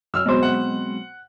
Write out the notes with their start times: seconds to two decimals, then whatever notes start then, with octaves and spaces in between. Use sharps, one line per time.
0.14 F#2 E6 F6
0.26 B2 F#3 G#3 C4 C5
0.43 F#5